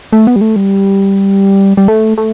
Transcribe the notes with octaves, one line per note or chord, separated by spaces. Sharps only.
A3
B3
G3
A3
G3
G3
A3
A3